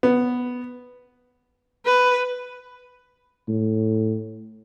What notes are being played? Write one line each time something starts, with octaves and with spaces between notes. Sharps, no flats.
B3
B4
A2